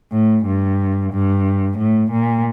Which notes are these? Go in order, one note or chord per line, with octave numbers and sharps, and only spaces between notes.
A2
G2
G2
A2
A#2